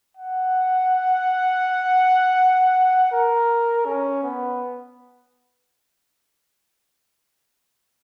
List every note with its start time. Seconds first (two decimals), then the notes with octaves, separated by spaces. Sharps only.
0.17 F#5
3.12 A#4
3.86 C#4
4.23 B3